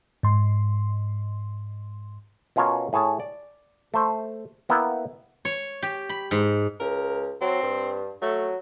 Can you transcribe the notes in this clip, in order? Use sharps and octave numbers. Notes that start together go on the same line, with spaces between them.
G#2 C6
B2 C#4 F4 A#4 C#5 A5
A2 G#4 C#5 A5
D5
A3 C5
A#3 B3 E4 A#4 G5
C#5
G4
B5
G#2
C#2 A#4
F#3 C4
G2
F#3 A3